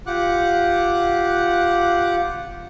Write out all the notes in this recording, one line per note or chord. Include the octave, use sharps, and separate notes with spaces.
F4 G4 F#5 D6 F#6